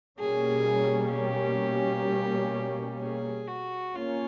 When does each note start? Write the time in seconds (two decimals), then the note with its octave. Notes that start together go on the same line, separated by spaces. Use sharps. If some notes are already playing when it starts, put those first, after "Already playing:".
0.19 B2 G3 A#3 C#4 G#4
1.13 G4
3.01 G#4
3.48 F#4
3.95 A#3 C#4 F4